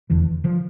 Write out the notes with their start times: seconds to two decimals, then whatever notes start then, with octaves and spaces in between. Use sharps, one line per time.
0.10 F1 E2 D3 E3
0.44 D3 F3